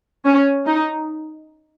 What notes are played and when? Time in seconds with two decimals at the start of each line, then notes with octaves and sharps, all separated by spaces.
0.25 C#4
0.66 D#4